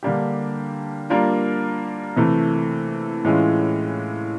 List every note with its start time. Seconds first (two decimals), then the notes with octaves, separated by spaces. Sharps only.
0.03 D3 G3 A#3 D4 G4
1.10 G3 A#3 D4 F4 A#4
2.16 C3 E3 A3
3.25 A2 E3 G#3 C#4 F4